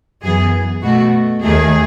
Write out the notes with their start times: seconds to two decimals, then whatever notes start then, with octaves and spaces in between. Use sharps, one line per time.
0.23 F#2 E3 B3 G#4
0.83 B2 A3 F#4
1.42 D#2 D#3 A3 G#4